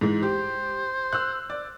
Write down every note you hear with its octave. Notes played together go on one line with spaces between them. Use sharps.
G#2 E3 G#3
G4 C5
E6 F#6
D5